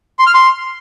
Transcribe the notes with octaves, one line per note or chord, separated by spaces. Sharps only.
C6
F6
C6